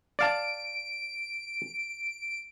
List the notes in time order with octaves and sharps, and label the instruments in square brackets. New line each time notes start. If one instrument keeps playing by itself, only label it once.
[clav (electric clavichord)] D5 F5 A5 [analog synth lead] D7